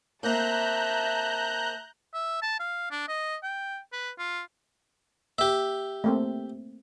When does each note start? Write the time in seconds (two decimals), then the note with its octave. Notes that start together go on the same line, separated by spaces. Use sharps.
0.23 A#3 C4 E5 A5 A#5 F#6 G6
2.14 E5
2.42 A5
2.60 F5
2.91 D4
3.08 D#5
3.43 G5
3.92 B4
4.19 F4
5.38 A#3 G4 E5
6.04 A3 A#3 C4